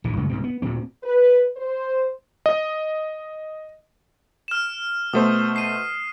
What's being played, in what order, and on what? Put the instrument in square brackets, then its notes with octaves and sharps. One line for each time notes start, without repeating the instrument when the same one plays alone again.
[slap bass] A#1 A#2 E3
F#2 C#3 G#3 A3
C2 G#2 B2 C4
B3
D2 A#2 F#3 C4
[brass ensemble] B4
C5
[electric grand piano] D#5
[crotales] F6 E7
[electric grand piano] B2 A3 C5 [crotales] D#6
[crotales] C7 D#7